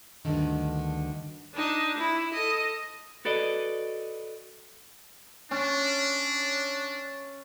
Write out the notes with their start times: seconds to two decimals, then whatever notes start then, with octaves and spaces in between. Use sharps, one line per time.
0.25 D2 G2 A#2 D3 D#3
1.54 D4 D#4
1.97 E4
2.33 A4 D#5
3.25 F#4 A4 B4 D5 D#5
5.51 C#4 D4